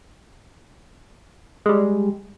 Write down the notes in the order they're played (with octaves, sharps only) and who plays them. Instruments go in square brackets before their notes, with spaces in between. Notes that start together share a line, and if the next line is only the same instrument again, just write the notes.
[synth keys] G3 G#3